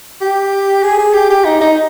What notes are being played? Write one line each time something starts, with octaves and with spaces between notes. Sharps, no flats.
G4
G#4
G#4
G4
G4
D#4
D#4